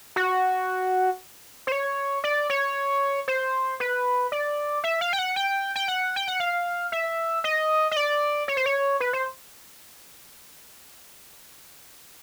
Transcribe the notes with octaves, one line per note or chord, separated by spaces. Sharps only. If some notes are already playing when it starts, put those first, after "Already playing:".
F#4
C5
C#5
D5
C#5
C5
B4
D5
E5
F5
G5
F#5
G5
G5
F#5
G5
F#5
F5
E5
D#5
D#5
D5
C#5
C5
C#5
B4
C5